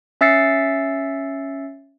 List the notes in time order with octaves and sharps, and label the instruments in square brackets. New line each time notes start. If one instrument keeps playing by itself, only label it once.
[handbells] C#4 E5 E6 A6 C7 C#7